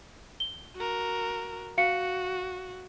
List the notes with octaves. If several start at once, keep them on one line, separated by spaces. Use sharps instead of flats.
G7
F#4 A#4
F#4 F5 C#7